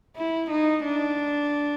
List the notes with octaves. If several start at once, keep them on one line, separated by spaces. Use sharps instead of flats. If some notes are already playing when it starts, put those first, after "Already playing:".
E4
D#4
D4